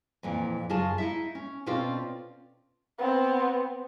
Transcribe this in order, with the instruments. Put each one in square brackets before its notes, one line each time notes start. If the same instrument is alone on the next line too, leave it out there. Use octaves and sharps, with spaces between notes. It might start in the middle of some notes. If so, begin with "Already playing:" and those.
[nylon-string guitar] F2 A#2 E3
F#2 C#3 F4 G#4 A5
D#4 E4 E5
C#4
B2 C4 C#4 F4 A4 D5
[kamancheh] B3 C4